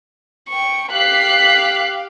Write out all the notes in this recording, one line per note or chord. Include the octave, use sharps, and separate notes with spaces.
G5 C#6
G4 F5 F#6 B6 C7